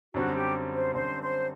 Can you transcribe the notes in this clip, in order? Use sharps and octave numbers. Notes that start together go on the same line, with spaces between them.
F#2 D3 G3 C4 F#4
G4
C5
F#2 D3 G3 C4 C5
C5